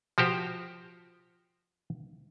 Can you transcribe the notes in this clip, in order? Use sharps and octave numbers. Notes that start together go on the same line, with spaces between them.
F3 F#4 G4 C5